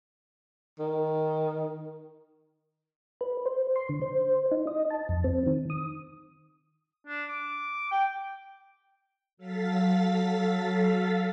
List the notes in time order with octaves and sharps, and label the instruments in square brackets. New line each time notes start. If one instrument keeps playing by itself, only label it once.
[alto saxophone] D#3
[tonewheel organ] B4
C5
C6
D3
C5
D#4
D#5
A5
F2
C4
D#3
D#6
[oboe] D4
D6
G5
[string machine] F#3 A4 F5 A6 B6